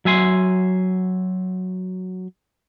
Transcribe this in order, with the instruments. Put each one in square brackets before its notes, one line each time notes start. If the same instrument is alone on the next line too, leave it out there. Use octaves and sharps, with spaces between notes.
[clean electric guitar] F#3 E5 G#5 C6